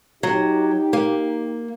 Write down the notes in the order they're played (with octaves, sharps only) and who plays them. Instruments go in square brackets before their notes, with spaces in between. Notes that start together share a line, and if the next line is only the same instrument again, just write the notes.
[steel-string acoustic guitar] F#3 [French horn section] D#4 G4
[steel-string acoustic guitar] A#3